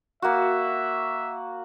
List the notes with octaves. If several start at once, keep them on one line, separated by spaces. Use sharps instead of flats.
A#3 F#4 E5